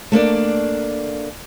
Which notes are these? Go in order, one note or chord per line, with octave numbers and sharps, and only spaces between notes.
A3 A#3 D4 D5